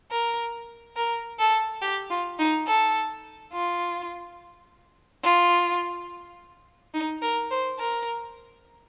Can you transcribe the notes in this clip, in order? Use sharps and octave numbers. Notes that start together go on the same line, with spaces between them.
A#4
A#4
A4
G4
F4
D#4
A4
F4
F4
D#4
A#4
C5
A#4